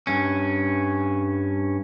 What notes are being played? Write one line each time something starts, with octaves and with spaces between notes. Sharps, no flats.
G2 C#4